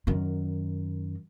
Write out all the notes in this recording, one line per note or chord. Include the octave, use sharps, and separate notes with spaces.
F#2 D#3